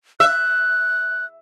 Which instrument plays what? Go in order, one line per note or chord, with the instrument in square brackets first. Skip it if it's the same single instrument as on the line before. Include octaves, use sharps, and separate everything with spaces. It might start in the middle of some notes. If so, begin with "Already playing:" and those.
[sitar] E5 [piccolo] F#6